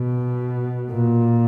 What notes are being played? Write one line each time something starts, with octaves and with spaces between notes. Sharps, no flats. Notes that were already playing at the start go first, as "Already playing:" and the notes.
Already playing: B2
A#2